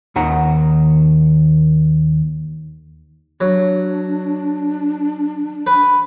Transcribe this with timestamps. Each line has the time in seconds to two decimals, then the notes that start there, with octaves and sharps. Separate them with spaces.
0.16 D#2 D#3 F#5 A#5
3.41 F#3 D4
5.67 B4